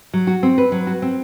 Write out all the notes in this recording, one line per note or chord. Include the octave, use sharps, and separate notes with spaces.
F#3
F#4
C4
B4
F#3
F#4
C4